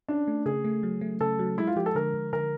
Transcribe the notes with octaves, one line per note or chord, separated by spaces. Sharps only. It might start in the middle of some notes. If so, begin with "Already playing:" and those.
C#4 D4
A3
C#3 G#4
A3
F#3
A3
C#3 A4
F#3
G#3 E4
F4
F3 G4
A4
D3 A#4
D3
D3 A#4